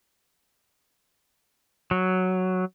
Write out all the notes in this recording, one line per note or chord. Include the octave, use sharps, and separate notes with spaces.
F#3